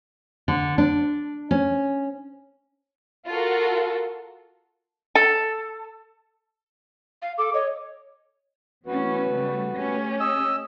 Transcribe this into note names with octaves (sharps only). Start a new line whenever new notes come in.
D3
D4
C#4
F4 F#4 A4 A#4
A4
F5
A4 D6
C#5 D#5
E3 A3 B3 C#4 F#4 B4
C#3 G3 A3
A3 C#4 G4
D#5 E6